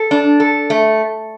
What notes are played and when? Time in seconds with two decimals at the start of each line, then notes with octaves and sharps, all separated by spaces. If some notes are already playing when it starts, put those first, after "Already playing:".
Already playing: A4
0.11 D4
0.40 A4
0.70 A3